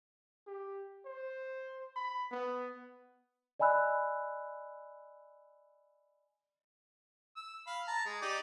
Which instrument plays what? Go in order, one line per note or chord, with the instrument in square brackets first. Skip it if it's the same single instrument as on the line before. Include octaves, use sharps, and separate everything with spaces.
[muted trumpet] G4
C5
B5
B3
[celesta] D5 D#5 G#5 B5 E6 F#6
[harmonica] E6
F5 B5
A5 A#5
G#3
D#4 G4 D5